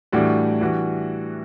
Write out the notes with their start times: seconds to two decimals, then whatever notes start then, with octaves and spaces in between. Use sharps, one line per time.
0.12 A2 E3 G3 D4 F#4
0.61 E3 G3 D4 F#4